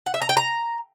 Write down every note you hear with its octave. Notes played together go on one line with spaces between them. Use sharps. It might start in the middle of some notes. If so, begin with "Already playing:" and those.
F#5
E5
A#5
G5
A#5